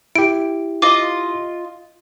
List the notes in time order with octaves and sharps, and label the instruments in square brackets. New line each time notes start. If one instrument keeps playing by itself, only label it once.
[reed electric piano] E4 G4 [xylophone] D7
[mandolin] F4 D#5 [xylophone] D6